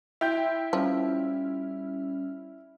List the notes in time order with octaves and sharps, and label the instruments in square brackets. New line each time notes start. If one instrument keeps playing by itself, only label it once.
[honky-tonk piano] E4 G5 G6 [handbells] E5 [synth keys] C6
[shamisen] F3 [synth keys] G3 C#4 F6